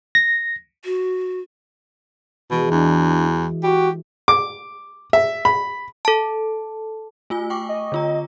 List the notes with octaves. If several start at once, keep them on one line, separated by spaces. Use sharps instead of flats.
A#6
F#4
B2 E3 G#3 F#4
E2 D4
F#4 G4
D6
E5
B5
A4 A5
A3 F4 G#5
G5 C#6 D6
D#5
D3 F4 A#5